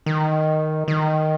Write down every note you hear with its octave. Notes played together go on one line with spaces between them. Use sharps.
D#3
D#3